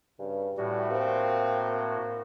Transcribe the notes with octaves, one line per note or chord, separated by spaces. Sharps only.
G2 C#3
A2 E3 G3 F#4
A#3 C4